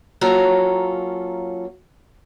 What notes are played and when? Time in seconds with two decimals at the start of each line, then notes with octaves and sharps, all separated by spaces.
0.21 F#3 A#3 C#4 F4 A4 A#5